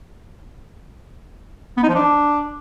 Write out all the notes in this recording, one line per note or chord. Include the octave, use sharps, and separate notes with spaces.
B3
D#4
F3
D4